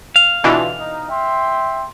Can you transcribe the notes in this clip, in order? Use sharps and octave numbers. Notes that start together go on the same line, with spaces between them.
F5
B2 D3 E3 F4 E5
D#4
E5 G5 C6